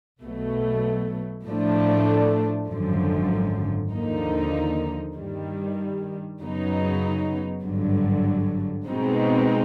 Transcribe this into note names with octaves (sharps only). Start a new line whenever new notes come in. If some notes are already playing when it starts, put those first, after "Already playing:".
B1 B2 F#3 A3
A2 F3 A3 D4
G#1 F#2 D3 F3
D#2 D3 F3 A#3 D#4
G2 D#3 G3
F#2 C#3 F#3 B3 D#4
G#1 G2 D3 F#3
B2 G#3 C4 D#4